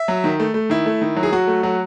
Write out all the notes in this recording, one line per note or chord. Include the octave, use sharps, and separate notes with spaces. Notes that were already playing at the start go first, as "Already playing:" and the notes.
Already playing: E5
F#3
D#3
A3
A3
D#3 E4
A3
D#3
F#3
G#4
F#3 F#4
A3
F#3 F#4